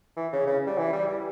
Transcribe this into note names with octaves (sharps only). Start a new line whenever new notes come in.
E3
C#3
C#3
G3
E3
G3
G3